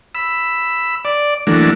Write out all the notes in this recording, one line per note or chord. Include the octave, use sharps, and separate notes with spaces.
B5 E6
D5
E3 F#3 A3 A#3 D4